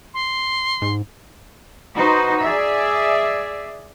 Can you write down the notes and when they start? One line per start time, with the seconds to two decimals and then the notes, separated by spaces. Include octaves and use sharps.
0.14 C6
0.82 G#2
1.96 D#4 F#4 B4 C5
2.41 G#4 D5 E5